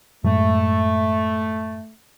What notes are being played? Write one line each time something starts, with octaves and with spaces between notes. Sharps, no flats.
F#2 A2 G#3 A3